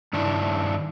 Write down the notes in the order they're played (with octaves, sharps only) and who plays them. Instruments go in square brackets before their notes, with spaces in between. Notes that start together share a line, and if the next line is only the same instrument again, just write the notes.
[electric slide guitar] G2 D#3 D4 E4